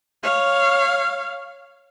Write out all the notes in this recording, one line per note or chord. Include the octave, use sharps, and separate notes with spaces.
C#5 F5